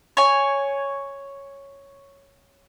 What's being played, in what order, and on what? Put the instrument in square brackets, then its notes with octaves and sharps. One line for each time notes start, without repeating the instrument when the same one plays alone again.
[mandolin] C#5 G#5